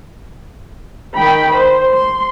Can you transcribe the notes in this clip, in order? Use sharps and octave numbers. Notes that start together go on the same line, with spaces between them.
D#3 G5 B5
C5
C6